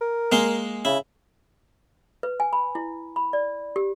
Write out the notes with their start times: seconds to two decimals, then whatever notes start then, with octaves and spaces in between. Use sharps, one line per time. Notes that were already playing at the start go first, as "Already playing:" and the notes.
0.01 A#4
0.32 G#3 A#3 C6
0.85 C#3 E4
2.23 B4
2.40 G#5
2.53 B5
2.75 E4
3.16 B5
3.33 D5
3.76 G4